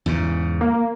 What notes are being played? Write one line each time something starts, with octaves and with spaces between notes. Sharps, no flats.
E2 G#2 C#3
A#3